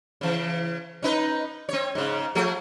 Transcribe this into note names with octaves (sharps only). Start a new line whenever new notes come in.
C#3 E3
C#4 D#4 B4
C4 C#5
G#2 C#3
F3 A3 G#4